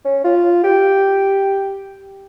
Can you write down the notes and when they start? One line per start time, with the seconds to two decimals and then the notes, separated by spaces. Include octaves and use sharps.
0.05 C#4
0.24 F4
0.64 G4